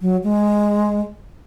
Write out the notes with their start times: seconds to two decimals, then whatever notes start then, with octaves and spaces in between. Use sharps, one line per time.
0.01 F#3
0.24 G#3